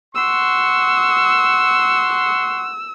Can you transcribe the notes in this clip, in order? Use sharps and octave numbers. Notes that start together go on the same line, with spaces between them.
F#5 C6 C#6 E6